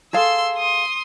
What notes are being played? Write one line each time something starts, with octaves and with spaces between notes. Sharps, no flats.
G#4 A4 F5 C6 E6
C6 D#6